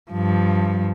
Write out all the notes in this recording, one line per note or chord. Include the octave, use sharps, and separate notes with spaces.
G2 F3